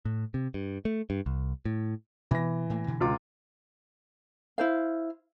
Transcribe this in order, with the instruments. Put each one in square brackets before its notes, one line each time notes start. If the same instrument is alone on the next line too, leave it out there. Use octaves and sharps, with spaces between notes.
[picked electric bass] A2
C3
G2
A3
G2
C2
A2
[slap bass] B2 B3 [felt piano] E3 A#6
[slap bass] A2 A3 A#3
G2 B2 D3
[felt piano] C#2 F4 D6
[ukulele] E4 C5 F5